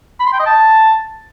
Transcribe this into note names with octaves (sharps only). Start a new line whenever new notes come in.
B5
C6
G5
D#5
A5